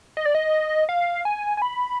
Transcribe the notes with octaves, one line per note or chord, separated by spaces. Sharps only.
D#5
D5
D#5
F5
G#5
G#5
B5